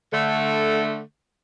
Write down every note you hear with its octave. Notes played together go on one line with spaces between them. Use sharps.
D3 A3